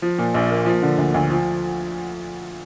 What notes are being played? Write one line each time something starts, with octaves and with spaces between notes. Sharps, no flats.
F3
A#2
A#1
A#3
F3
D3
D2
D2
F3